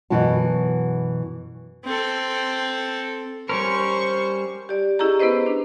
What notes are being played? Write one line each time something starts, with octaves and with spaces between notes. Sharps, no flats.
F#2 B2 E3 B3 F#4 A5
C4 A4
G3 C#4 A#4 C5 C#6
G4 D5
C#4 E4 G4 G#4 D#5 A#5
B3 E4 B4 C5 D#5
D4